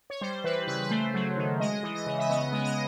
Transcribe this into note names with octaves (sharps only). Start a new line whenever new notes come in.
C#5
G3 C5
E3 B4
C#3 B4
B4
A3 C5
F#3
D#3
G#3 D#5
E3
D#5
C#3
E5
B3 D#5
G#3
D#5